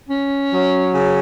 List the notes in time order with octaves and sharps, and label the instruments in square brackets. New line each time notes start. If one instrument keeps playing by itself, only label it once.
[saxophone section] C#4
F#3
C#3